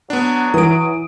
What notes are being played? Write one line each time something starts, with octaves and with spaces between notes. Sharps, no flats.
F#3 B3 D4
E3 D#6 D7